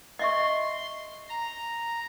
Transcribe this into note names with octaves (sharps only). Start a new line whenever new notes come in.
D#5 E5 C6 C#6
A#5